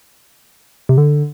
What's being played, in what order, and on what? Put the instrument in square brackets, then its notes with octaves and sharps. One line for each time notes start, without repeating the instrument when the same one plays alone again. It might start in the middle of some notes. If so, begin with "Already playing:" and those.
[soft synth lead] C3
D3